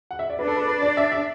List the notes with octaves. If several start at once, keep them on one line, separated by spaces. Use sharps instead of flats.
F#5
E5
D5
D4 B4
A4
B4
B4
D5
E5
E5